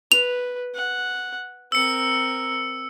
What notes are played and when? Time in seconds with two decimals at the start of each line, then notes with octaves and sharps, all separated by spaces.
0.12 B4 F7
0.75 F#5
1.72 C4 A#4 E6 C#7